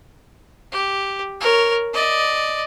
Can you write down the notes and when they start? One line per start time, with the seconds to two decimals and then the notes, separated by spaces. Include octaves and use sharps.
0.72 G4
1.40 A#4 C#5
1.94 D5 D#5